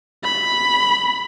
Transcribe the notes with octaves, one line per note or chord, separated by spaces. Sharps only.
B5